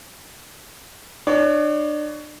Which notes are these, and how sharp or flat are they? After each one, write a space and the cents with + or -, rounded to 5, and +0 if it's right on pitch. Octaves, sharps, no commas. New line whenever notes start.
D4 +35 C#5 +25